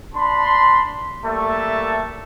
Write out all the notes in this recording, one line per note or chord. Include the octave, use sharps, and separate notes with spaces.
D4 A5 B5 C6
G3 A3 A#3 E5 A5 C#6